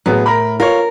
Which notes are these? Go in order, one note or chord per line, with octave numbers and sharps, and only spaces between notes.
A2 F#3 B3 G#4
A#4 B5
F4 A#4 C#5